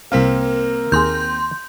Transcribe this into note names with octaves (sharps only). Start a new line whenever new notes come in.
C2 A#3 C4 A#4 F5 B6
D#2 G#4 C6 G6